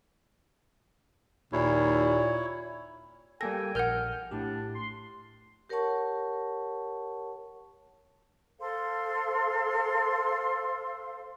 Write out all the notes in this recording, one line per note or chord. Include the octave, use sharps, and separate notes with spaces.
D#2 A#2 E4 C#5
G3 A#3 A4 G5 G#5 A#6
A#1 A#4 F#5 F6 G6
A2 D4 G4
C6
G4 A#4 C#5 F#5 A5 C#6
A4 C5 F5 C6